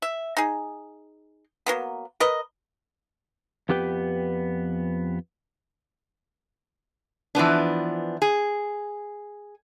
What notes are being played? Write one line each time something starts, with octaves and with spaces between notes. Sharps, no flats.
E5
D#4 G#4
F#3 A#3 B3
A#4 B4 D#5
F2 B3 G4 B4 G5
E3 F3 B3 D4
G#4